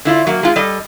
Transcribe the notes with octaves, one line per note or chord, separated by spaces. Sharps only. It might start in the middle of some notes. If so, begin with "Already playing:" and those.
D3 E4 F4
F#3 A#3
G#3 F4
G3 A4 D#5